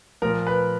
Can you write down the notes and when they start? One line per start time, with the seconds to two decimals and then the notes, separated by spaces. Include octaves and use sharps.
0.22 A#2 F3 A#4
0.47 B4